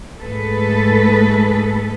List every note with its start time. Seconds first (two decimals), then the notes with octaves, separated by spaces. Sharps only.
0.22 G#2 A3 G#4 A4 B4